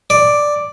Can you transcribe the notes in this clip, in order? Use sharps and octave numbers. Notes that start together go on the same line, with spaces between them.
D5